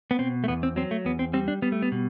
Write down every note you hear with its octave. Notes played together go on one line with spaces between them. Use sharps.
B3
B2 C4
A3
E2 B3
C4
F#3 C4
A3
E2 B3
C4
G3 C4
D4
G3 B3
A3
B3
B2